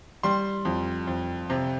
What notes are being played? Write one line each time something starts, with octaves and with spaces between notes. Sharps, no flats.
G3 C6
F2
F2
C3